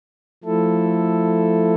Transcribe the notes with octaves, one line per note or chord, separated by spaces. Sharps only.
F3 A3 E4 A4